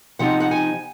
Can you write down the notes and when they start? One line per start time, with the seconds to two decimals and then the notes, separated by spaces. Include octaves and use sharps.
0.19 C3 F3 C4 D#4 F#5
0.40 F#5
0.51 G#5